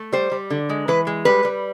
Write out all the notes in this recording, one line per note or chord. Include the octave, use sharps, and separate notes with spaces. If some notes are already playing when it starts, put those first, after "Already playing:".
Already playing: A3
G3 C5
G3
D3
G#3
E3 B4
G#3
G3 B4
G3